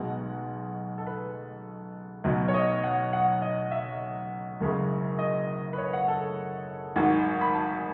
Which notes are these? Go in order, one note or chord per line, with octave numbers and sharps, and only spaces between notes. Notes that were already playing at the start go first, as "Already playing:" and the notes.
Already playing: B1 B2 G#3 F#5
A4
B4
B1 B2 F#3
C#5
D#5
F#5
F#5
D#5
E5
F#1 F#2 C#3 G#3
D#5
B4
C#5
F#5
A4
G#1 G#2 F#3
B5
A5